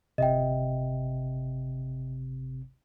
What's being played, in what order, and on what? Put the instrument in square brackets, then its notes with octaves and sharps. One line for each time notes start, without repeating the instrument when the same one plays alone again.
[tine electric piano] G1 C3 [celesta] D#5 E5 G5